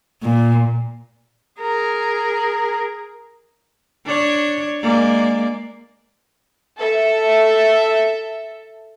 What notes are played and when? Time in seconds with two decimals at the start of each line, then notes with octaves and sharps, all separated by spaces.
0.23 A#2
1.61 G#4 A#4
4.05 D4 C#5
4.81 G#3 A#3 D5
6.78 A4 E5